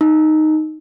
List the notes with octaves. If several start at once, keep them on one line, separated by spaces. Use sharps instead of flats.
D#4